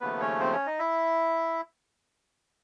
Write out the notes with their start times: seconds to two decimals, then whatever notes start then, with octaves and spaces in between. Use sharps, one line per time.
0.01 D#2 C#3 F3 A3 B3 B4
0.20 C#4 C#5
0.40 C4 C5
0.53 C#4 C#5
0.66 D#4 D#5
0.79 E4 E5